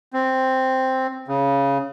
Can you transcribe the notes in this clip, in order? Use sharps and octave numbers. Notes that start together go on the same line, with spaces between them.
C4
C#3